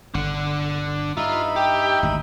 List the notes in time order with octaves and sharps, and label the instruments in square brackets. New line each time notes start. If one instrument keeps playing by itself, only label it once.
[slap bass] G1 D3 [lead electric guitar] D4 F#5
[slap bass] G2 [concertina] D#4 E5 B5 [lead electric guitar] F4
[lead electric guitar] G4 [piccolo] G5
[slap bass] G#1 D2